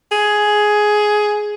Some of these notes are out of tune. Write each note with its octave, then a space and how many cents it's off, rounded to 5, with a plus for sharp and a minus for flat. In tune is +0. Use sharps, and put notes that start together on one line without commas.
G#4 +10